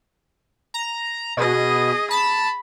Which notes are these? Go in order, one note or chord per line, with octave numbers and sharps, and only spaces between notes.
A#5
B2 G#4 D#5
A5 B5